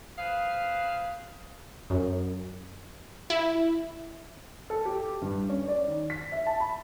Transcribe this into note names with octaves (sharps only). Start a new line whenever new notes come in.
G#4 B4 C5 F5
F#2
E4
A4
G4
G2
C#4
D5
D#3
B6
E5
A5
B5